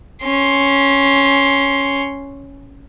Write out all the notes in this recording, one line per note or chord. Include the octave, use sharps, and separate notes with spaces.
C#4 C6